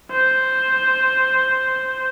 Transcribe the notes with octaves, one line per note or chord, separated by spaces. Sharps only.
C5